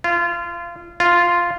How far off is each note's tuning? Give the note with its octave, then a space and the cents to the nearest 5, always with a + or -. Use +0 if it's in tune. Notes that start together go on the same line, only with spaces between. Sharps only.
F4 -25
F4 -5